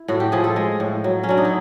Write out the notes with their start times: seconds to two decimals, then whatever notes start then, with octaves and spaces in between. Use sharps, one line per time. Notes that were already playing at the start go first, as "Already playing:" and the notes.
Already playing: E4
0.08 A2 F#4
0.20 G4
0.32 F3 G#4
0.44 A4
0.56 G#3
0.80 A2
1.04 F#3
1.23 C#4
1.29 F#3 D4
1.38 D#4
1.45 E4